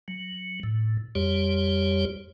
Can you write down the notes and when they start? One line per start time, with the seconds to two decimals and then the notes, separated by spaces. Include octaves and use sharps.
0.08 F#3
0.63 A2
1.15 F2 G3 G4 C#5